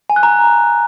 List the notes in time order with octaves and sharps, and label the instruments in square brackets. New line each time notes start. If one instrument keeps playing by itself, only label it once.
[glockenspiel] G#5
F#6
A#5